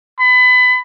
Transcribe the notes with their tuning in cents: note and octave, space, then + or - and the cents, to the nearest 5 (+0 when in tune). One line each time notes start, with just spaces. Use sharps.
B5 +25